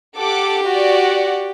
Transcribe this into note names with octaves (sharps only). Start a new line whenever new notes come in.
G4 A4 F#5 D6
F#4 D5 F#5